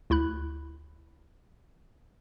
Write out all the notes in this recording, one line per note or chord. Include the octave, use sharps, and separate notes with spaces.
D2 E4 B5 F#6